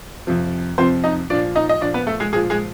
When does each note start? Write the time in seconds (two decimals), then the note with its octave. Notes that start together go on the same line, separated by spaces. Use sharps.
0.27 F2 C3 F3
0.78 F2 C3 F3 C4 C5
1.04 D#4 D#5
1.30 F3 D4 D5
1.34 A#2
1.55 D#4 D#5
1.69 D#5
1.81 A#2 F3 D4 D5
1.94 B3 B4
2.07 A3 A4
2.20 G#3 G#4
2.32 A#2 F3 G#3 G#4
2.50 G#3 G#4